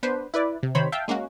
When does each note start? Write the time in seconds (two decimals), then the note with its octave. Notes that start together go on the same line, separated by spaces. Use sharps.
0.03 B3 D4 B4 C5
0.34 E4 B4 D5
0.63 C3
0.75 C3 D#3 C5 C#5 B5
0.92 E5 F5 G5 A5
1.08 G#3 A#3 C#4 F#4